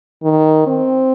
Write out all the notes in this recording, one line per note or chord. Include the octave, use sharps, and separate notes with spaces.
D#3
C4